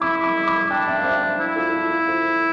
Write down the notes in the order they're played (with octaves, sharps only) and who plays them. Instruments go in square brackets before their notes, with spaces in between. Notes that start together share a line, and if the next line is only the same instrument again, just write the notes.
[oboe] E4 [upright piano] B5 D6
[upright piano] B5 D6
B5 D6
[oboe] D4 [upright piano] G5 B5
[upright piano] E5 G5
F5
C5 E5
C5 E5
[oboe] E4
[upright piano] F4 A4
F4
F4
A4 C5